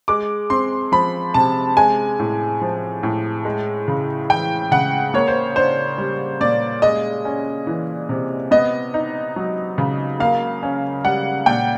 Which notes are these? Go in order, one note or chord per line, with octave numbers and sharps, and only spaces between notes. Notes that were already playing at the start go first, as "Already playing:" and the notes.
G#3 D6
C4 C6
F3 B5
C3 A5
G#3 G#5
A2
F3
A2
G#3
C#3
E3 G5
C#3 F#5
A#3 C#5
C5
D4 C5
G3
A#2 D5
G#3 D#5
C#4
E3
C3
B3 D#5
D#4
F#3
C#3
A#3 F5
C#4
G3 F#5
A#2 G5